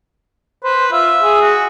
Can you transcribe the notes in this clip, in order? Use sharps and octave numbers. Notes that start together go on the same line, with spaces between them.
B4 C5
F4 E5
G#4
F#4